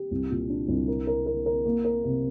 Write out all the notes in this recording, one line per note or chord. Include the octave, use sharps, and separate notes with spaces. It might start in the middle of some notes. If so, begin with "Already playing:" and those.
Already playing: G4
C2
A#2
D4
C2
A#4
A#4
A#4
A#4
A#3
A#4
C3